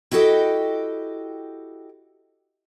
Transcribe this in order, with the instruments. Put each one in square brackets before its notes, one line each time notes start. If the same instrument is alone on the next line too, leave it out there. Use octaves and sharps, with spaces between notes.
[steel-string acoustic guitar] E4 F#4 G4 A4 D#5 G5